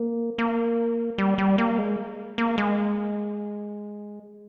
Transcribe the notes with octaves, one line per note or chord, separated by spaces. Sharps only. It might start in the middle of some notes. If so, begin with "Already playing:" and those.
Already playing: A#3
A#3
G3
G3
A#3
G#3
A#3
G#3